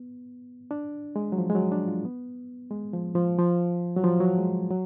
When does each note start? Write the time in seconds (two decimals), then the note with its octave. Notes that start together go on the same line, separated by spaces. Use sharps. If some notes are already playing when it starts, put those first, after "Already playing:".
Already playing: B3
0.71 D4
1.16 G#3
1.32 F#3
1.38 F3
1.50 G#3
1.55 F#3
1.72 D4
1.88 F4
2.05 B3
2.71 G#3
2.93 F3
3.15 F3
3.38 F3
3.97 F#3
4.04 F3
4.20 F#3
4.38 G#3
4.70 F#3